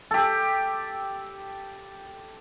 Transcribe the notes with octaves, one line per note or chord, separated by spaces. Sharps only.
G4 A4